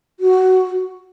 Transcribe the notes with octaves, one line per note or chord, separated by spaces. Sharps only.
F#4